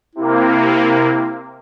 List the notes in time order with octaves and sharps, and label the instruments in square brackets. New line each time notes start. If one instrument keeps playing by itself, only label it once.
[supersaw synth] C3 A#3 [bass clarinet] E4